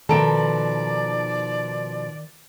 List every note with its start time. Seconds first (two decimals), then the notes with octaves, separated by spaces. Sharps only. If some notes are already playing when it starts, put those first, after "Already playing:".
0.09 B2 D#3 F3 A4 D5 A5 A#5 D7